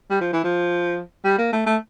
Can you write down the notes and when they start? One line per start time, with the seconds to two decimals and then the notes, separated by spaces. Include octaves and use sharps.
0.10 G3
0.21 F3
0.33 E3
0.44 F3
1.25 G3
1.38 A#3
1.53 A3
1.66 A3